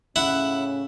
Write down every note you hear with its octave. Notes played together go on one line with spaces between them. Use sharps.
A2 C#3 C#4 E4 F#5